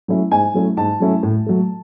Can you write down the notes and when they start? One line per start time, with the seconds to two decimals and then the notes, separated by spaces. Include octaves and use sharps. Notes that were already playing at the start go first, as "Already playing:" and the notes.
0.08 F#3 A3 C#4 E4
0.31 G#2 G#5
0.54 F#3 A3 C#4 E4
0.77 G#2 A5
1.00 F#3 A3 C#4 E4
1.23 A2
1.46 F#3 A3